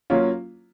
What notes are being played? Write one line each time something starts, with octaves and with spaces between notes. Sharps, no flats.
F#3 A#3 C#4 F4